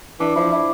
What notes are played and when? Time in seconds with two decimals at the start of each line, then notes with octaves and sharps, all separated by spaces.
0.20 E3 D4
0.36 F3 E4
0.52 E4